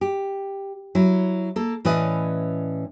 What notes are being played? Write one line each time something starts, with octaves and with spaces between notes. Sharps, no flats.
G4
F#3 E4
A#3 A4
A2 E3 C#4 B4 D5 D#5